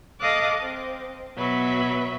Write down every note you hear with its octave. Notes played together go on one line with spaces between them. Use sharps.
A4 D#5 F5 D6 D#6 F#6
C4
B2 F#3 B4 E5